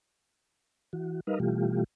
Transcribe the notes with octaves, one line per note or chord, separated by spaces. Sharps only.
E3 F#4
G3 D#4 A#4 B4 D#5 F5
B2 E3 G3 A3 F4 G4